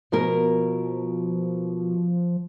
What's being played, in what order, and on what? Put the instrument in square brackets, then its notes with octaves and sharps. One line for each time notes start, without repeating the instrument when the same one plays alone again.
[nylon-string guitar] B2 A#3 A#4 [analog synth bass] F3